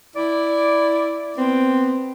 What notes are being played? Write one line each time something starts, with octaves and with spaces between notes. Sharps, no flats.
E4 D5
B3 C4